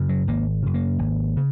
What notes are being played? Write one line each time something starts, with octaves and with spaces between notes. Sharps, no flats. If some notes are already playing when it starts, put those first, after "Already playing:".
Already playing: F#2 C#3
F#3
G#1 A#3
F#2 C#3
A#3
G#1
C#3